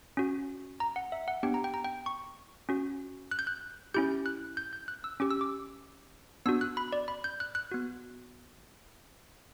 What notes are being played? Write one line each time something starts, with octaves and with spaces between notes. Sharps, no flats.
C#4 F#4
A#5
F#5
E5
F#5
B3 D4 G4 G5
A#5
G5
A#5
G5
C#6
C#4 F#4
F#6
G6
F#6
C#4 E4 G4 G6
F#6
G6
G6
F#6
E6
C#4 G4 D6
E6
D6
B3 D4 F#4 E6
F#6
B5
D5
B5
G6
F#6
F#6
B3 F#4